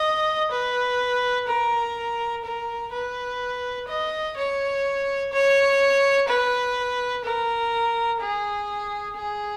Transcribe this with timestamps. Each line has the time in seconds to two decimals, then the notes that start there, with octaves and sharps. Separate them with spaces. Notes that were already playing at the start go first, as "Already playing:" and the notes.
Already playing: D#5
0.52 B4
1.48 A#4
2.45 A#4
2.92 B4
3.88 D#5
4.37 C#5
5.33 C#5
6.28 B4
7.24 A#4
8.21 G#4
9.17 G#4